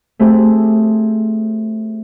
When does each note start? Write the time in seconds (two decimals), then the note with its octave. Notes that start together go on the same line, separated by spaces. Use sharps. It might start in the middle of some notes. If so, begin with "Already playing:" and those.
0.19 A3 C4 G4 G#4